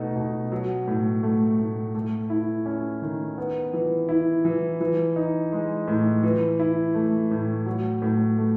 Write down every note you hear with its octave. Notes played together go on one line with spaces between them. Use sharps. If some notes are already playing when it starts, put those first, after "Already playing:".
Already playing: B2 A3 D#4
B2
F#3
A2
A3
A2
A3
E4
C#4
D#3
B3
E3
E4
E3
E3
D#4
G#3
A2
E3
E4
A3
A2
F#3
A2
A3